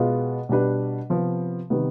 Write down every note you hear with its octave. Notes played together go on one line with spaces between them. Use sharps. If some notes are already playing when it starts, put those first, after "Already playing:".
Already playing: B2 G#3 B3 F4
B2 G3 D4 G4 B4
C3 F3 B3
C3 D#3 G3 B3